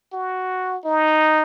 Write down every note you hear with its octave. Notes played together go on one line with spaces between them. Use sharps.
F#4
D#4